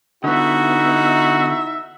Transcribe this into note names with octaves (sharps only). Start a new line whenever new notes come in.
D3 B3 D#4 E4 F#4 E5